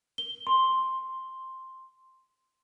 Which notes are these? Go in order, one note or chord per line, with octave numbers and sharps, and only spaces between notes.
G7
C6